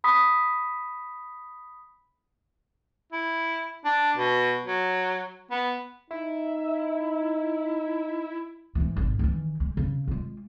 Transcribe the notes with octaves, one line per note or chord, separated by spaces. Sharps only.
B5 D#6 B6
E4
D4
B2
F#3
B3
D#4 E4
G#2 E3
G#1 D3
D#3 E3
G#3
C#3
G#3 F4